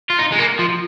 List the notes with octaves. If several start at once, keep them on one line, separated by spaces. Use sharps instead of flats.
F4
D#4
G#3
A#3
F3